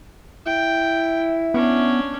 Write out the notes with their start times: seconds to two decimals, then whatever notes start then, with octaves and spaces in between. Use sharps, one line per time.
0.46 E4 G5
1.54 B3 C#4 D4